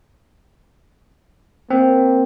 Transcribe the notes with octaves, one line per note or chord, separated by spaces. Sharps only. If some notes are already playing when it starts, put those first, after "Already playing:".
A#3 C4